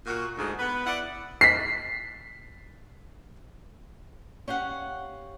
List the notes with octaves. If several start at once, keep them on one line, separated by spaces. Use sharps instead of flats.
A#2 F#4
D2 G#2
B3 B4
B3 E4 D5 F#5
B6 C7
C#4 G4 F5 F#5